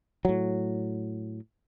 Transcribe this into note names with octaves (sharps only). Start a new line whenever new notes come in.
A2 F#3